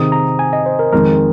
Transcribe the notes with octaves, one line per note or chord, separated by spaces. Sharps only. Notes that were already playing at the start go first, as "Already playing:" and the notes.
Already playing: C3 D#3 C4 D#4 G#4 D#6
A#5
G#5
D#5
C5
A#4
F2 D#3 G#3 A#4